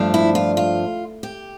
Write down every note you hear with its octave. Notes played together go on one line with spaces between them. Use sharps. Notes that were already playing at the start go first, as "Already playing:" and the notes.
Already playing: G2 F3 A3 D4
E4
F4
F4
G4